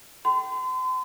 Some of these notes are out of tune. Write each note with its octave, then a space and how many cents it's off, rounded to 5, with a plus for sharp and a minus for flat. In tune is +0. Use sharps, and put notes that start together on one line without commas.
G5 -30 C6 -40